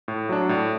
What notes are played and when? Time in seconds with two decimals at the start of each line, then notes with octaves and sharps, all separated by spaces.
0.08 A2
0.29 F#3 D4
0.49 A2